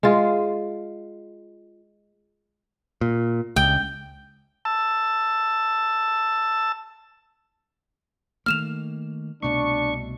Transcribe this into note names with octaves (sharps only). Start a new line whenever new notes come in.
G#3 F4
A#2
C#2 G5
A5 E6
D#3 A3 A#3 F6 E7 F7
C2 B2 A3 D4 C#6